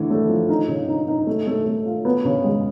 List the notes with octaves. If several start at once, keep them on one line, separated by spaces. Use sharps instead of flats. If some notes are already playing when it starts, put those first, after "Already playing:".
Already playing: D3 E3 A3
A3
F3
D#4
C#3
D#4
D#4
A3
A3
A3
F4
B3
C#3
G#3